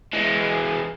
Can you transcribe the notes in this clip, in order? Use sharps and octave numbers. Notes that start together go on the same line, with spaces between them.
E3 G#3